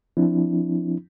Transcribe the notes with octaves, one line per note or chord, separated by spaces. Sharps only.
F3 C4 D4 E4